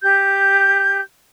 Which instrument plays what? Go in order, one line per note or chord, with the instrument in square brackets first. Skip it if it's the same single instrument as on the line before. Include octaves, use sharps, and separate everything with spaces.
[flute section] G4 G6